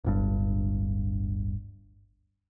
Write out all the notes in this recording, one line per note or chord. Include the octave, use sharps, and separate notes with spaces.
D1 G1 G2